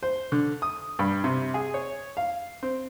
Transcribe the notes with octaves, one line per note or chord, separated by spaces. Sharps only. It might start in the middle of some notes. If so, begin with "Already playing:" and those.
C5
D3
D#6
G2
C3
G#4
C#5
F5
C4